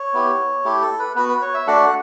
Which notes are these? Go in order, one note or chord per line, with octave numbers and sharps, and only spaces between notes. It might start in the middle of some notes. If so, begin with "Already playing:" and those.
Already playing: C#5
B3 E4 G4
A3 E4 G4
A4
B4
B3 F#4 B4
B4
C#5
E5
A3 D4 F#4 F#5